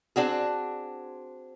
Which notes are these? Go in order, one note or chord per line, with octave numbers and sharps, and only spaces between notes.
C4 D4 F#4 G#4